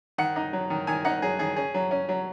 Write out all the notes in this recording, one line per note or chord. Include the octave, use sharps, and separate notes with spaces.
D#3 F#5
D#4
F#3
D#3
D#3 G#5
D#4 F#5
F#3 G#4
D#3 G#4
C#4 G#4
F#3
C#4
F#3